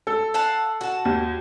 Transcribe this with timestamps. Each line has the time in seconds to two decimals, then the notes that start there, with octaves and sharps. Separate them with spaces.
0.07 A4
0.34 F5 F#5 A5
0.81 F#4 A5
1.05 D#2